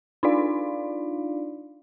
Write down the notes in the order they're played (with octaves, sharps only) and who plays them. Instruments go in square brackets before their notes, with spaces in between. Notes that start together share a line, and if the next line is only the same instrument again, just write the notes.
[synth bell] D4 D#4 F4 D5 F5